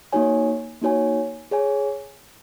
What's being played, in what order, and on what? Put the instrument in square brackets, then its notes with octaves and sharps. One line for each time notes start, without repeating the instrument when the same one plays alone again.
[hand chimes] A#3 D#4 F#4 C#5 G#5
A#3 D#4 F#4 C#5 G#5
G#4 C#5 G#5